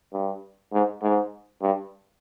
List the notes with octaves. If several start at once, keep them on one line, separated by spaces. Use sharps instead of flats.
G2
G#2
G#2
G2